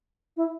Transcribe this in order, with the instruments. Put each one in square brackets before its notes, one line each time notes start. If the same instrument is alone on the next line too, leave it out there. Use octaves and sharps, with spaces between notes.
[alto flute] E4